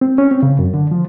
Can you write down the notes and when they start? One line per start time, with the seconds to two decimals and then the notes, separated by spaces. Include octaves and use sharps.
0.01 C4
0.18 C#4
0.31 C4
0.43 C#3
0.59 F#2
0.74 D3
0.91 F3